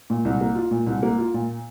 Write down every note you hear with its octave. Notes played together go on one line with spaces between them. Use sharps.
A#2
C2
A#3
F4
A#2
C2
A#3
F4
A#2